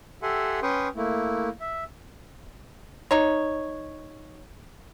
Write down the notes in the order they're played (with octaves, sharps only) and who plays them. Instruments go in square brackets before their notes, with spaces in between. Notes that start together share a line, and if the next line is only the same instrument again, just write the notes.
[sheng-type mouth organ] G4 A4 E5 F#5 G#5 C6
C#4 B4 G5 C6 C#6 D#6
A3 A#3 E4
E5
[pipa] D#4 C#5